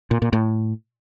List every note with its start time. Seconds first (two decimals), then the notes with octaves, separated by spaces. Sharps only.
0.11 A#2
0.22 A#2
0.33 A2